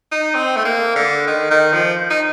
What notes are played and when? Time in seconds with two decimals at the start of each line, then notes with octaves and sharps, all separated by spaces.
0.12 D#4
0.34 C4
0.56 A3
0.65 A#3
0.96 D3
1.27 D#3
1.51 D#3
1.73 F3
2.10 D#4